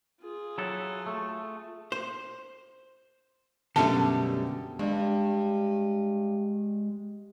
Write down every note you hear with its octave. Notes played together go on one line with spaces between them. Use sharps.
F4 G#4
F#3 E4 A4
A3
C5
F#2 B2 D3 G3 A3 B3 A5
G2 G#3